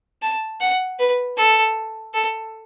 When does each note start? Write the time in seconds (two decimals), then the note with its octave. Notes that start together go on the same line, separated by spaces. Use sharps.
0.22 A5
0.61 F#5
0.99 B4
1.38 A4
2.14 A4